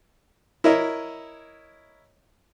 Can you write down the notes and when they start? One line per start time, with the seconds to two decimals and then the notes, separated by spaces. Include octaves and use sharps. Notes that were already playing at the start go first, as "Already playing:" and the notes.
0.64 E4 A#4 C#5 D#5 E5